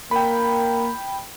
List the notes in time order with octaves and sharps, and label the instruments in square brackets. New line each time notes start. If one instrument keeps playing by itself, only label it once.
[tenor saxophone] A#3 [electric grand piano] G5 B5